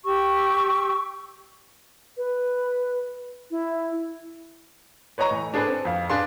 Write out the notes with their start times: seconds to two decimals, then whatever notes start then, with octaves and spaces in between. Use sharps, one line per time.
0.05 G4 C#6 E6
2.17 B4
3.51 E4
5.18 B4 C#5 D#5 A#5 C#6
5.31 A2 E3
5.54 D4 G#4 A4 B4 C5
5.68 C4
5.85 F2 F5
6.10 D4 G#4 B4 F5 C6